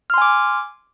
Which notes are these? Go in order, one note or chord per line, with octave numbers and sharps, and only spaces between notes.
G#5 C6 D6 F6